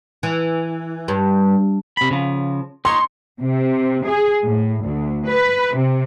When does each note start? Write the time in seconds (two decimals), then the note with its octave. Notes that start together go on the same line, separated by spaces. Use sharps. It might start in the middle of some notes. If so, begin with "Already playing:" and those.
0.23 E3
1.08 G2
1.97 C3 B5
2.11 C#3 F3
2.85 D#4 C#5 C6
3.41 C3
4.06 G#4
4.46 A2
4.85 D2
5.28 B4
5.75 C3